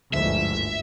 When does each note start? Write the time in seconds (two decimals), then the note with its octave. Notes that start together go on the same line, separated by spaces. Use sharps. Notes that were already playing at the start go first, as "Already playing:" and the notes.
0.14 G1 D2 G#2 D3 F3 G#3 E5